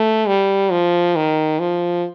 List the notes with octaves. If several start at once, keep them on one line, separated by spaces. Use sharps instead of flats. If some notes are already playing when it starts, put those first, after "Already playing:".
Already playing: A3
G3
F3
D#3
F3